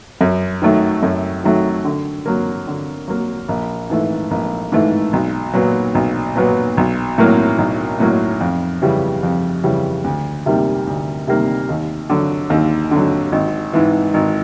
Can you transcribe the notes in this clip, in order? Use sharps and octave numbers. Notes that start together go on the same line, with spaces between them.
F#2
D#3 F#3 A3
F#2
D#3 F#3 A3
D3
F#3 A#3
D3
F#3 A#3
A#1
G#2 E3 A3
A#1
G#2 E3 A3
B1
A#2 F#3 B3
B1
A#2 F#3 B3
B1
A2 F#3 A#3
B1
A2 F#3 A#3
F2
C#3 E3 G3
F2
C#3 E3 G3
D2
C3 D#3 G3 A#3
D2
C3 D#3 G3 A#3
D#2
D3 F#3
D#2
D3 F#3
G#1
G#2 E3
G#1